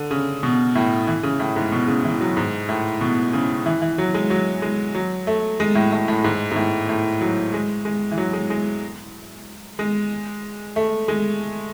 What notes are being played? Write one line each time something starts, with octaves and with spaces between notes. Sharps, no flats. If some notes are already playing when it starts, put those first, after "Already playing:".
Already playing: D3
C#3
B2
A2
E3
C#3
A2
G#2
B2
C#3
E3
F#3
G#2
A2
B2
C#3
E3
E3
F#3
G#3
F#3
G#3
F#3
A3
G#3
A2
A2
A2
G#2
G#2
A2
A2
F#3
G#3
G#3
E3
F#3
G#3
G#3
G#3
A3
G#3